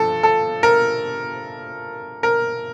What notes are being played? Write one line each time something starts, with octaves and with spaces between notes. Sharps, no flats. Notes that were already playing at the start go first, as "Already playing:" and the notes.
Already playing: G2 F3 A4
A4
A#4
A#4